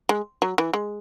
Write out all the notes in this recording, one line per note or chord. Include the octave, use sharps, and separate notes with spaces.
G#3
F#3
E3
G#3